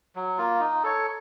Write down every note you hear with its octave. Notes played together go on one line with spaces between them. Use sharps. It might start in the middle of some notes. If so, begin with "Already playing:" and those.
F#3
A#3 F4
D#4
A4 C#5